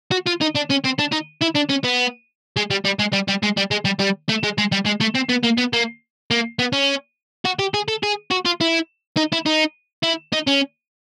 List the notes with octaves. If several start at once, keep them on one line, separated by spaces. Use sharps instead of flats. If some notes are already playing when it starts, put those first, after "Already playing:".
F#4
F4
D#4
D4
C#4
C4
D4
D#4
E4
D4
C#4
B3
G#3
G3
G3
G#3
G3
G3
G#3
G3
G#3
G3
G3
A3
G#3
G#3
G3
G#3
A3
C4
B3
A#3
B3
A#3
A#3
B3
C#4
F#4
G4
G#4
A4
G#4
F#4
F4
E4
D#4
E4
D#4
E4
D#4
C#4